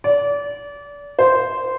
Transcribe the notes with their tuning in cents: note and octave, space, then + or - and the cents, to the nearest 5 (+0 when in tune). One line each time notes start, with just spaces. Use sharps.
D5 -30
C5 -10